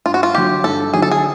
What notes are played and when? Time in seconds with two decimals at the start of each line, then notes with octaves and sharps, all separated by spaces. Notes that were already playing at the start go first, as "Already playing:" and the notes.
0.06 G2 F4
0.14 F#4
0.23 F4
0.35 D3 F#3 G4
0.64 G2 A4
0.94 D3 F#3 G#4
1.02 A4
1.11 G#4